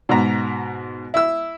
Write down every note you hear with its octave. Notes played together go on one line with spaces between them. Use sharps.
G#2 B2 F#4 A#5
E4 E6